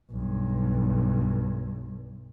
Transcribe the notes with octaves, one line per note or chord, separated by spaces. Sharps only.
B1 G2